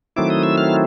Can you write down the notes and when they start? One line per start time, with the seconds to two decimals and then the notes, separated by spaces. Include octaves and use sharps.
0.16 D#3 F#3 A3 C4 E4 D6
0.30 D#6
0.43 E6
0.58 F6